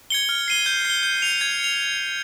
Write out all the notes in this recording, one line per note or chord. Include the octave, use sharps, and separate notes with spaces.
G#6 C#7 G7
F6
C7 D#7 G7
G6
C7 G7
G6
C#7 F7
G#6
C#7 F7